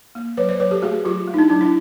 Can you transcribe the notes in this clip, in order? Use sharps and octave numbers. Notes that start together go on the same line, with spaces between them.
A#3
F#3 B4 C#5
C5 D5
F#3 B4 C#5
G4 A4
A3 F#4 G#4
F#3 F4 G4
A3
D#4
D4 E4
F#3 D4
D4 E4